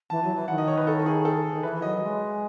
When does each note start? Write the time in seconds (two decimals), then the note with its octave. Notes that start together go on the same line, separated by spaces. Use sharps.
0.10 E3 A5
0.24 F#3
0.35 E3
0.48 D#3 F#5
0.58 D#5
0.68 C#5
0.78 B4
0.87 A4
1.06 G#4
1.25 A4
1.53 D#3
1.63 E3 B4
1.82 F#3 D#5
2.02 G#3